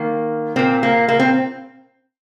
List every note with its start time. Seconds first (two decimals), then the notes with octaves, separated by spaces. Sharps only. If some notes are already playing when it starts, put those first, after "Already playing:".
Already playing: D#3 A#3
0.56 A#2 A#3 C4
0.83 A#3
1.08 A#3
1.19 C4